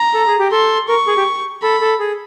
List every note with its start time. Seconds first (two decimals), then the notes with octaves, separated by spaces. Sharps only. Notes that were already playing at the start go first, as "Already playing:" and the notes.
Already playing: A#5
0.14 A4
0.27 G#4
0.39 G4
0.52 A4 C6
0.89 A#4 C#6
1.07 G#4
1.17 G4
1.63 A4 B5
1.81 A4
1.99 G#4